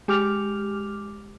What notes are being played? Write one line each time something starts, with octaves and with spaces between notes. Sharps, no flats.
G#3 G4 D6 F6 F7